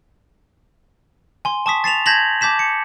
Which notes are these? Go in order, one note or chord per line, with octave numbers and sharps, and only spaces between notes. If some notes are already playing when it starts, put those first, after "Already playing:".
G#5 C6
A5 C#6 D#6 B6
A6 C7 E7 F7
A5 G6 G#6 A#6 B6 F#7
A5 D6 G6 B6 E7
C#7